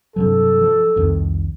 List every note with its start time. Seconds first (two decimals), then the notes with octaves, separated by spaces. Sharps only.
0.16 G2 C3 F#3 A4
0.62 F3
0.96 C2 F2 D#3